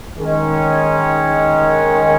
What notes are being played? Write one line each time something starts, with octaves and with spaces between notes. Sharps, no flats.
D#3 G#3 C#4